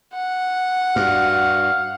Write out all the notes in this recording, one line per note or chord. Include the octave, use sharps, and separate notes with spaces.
F#5
G2 F#4 F5